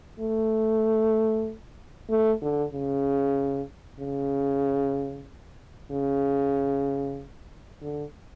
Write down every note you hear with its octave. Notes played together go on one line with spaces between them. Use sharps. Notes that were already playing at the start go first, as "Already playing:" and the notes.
A3
A3
D3
C#3
C#3
C#3
D3